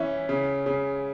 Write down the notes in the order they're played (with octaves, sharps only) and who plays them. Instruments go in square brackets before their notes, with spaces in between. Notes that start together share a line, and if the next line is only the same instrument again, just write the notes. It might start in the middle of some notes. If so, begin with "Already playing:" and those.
Already playing: [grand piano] E3 C#4 [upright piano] E5
[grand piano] C#3
C#3